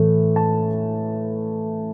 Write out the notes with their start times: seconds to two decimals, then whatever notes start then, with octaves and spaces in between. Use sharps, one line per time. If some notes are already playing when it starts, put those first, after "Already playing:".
Already playing: A2 E3 A3
0.36 A5